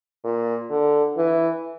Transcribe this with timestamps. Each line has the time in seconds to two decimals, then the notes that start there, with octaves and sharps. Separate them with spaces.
0.24 A#2
0.71 D3
1.17 E3